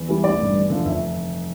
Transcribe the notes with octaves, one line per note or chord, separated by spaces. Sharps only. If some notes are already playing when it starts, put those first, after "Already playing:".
Already playing: E2
E3 G3
A1 D5
G2 D3
E2
D3 F3
F1 E5